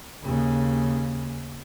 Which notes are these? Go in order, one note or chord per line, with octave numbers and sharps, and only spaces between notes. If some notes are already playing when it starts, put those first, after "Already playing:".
D#2 C#3